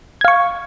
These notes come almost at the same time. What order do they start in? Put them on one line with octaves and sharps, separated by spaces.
G#6 F5 C#6